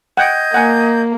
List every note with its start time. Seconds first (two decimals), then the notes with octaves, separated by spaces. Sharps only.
0.17 D#5 F#5 G5 G6 G#6
0.54 A#3 F#5 G#5